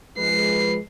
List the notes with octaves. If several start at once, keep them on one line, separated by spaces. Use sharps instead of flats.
F3 G#3 B4 C7